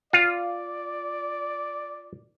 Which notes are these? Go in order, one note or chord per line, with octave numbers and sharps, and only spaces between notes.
F4 D5